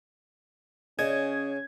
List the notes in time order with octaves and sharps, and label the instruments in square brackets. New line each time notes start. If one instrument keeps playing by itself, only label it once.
[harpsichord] C#3 [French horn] C#4 [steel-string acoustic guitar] D#5 [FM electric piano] G#6